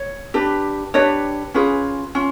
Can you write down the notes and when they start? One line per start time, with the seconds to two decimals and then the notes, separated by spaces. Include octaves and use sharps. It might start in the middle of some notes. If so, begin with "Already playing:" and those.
Already playing: C#5
0.34 D4 G4 B4
0.94 D4 G4 B4 C#5 D#5
1.54 C#4 F4 G#4 B4
2.15 C#4 F4